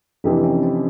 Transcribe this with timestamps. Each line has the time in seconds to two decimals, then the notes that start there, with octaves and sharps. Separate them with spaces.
0.24 F1 F2 C3 E3 D4
0.44 C#4
0.63 C4